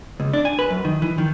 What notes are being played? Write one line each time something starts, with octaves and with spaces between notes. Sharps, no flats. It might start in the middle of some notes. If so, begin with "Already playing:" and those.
C#2
D4
G#5
B4
F#2
D#3
E3
D#3